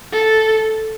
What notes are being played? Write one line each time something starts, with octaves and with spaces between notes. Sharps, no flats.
A4